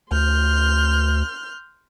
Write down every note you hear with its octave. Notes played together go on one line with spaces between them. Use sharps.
D2 C6 F6 G6